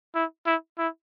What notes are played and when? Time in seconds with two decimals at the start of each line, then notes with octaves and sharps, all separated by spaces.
0.15 E4
0.46 E4
0.78 E4